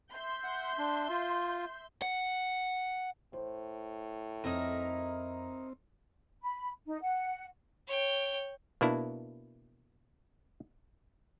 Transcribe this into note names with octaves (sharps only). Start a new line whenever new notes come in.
E5 C6 G6
F#5
D4
F4
F#5
A2 C5
F2 C4 D#4 E4 A#4
B5
D#4
F#5
C#5 G5
B2 A#3 D4 E4